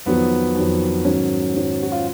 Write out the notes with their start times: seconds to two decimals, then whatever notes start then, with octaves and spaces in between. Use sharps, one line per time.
0.06 F2 D#3 F#3 B3
0.55 F2 D#3 F#3
1.05 G#2 D#3 F#3 C#4
1.54 G#2 D#3 F#3
1.82 F#4
1.92 F4